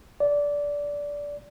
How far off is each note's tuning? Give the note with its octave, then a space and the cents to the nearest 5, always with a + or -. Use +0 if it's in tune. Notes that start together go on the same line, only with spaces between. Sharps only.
D5 -15